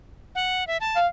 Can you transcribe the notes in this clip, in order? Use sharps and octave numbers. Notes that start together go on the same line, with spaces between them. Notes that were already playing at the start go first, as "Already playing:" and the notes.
F#5
E5
A5
F5